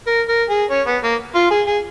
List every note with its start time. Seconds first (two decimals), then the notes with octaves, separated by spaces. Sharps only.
0.07 A#4
0.28 A#4
0.50 G#4
0.71 C#4
0.86 B3
1.03 A#3
1.35 F4
1.51 G#4
1.67 G#4